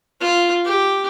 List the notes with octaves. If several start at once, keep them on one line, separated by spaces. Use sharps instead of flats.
F4
G4